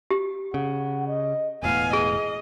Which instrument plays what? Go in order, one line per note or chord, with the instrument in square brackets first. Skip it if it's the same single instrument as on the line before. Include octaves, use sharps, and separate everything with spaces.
[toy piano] G4
[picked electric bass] C#3 [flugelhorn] F#5
[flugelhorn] D#5
[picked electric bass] E1 A2 [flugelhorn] B3 [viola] F5 G#5
[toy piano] G#4 [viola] D#5